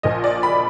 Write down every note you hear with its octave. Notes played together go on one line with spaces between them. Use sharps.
A#1 A#2 F3 D#5
D5
B5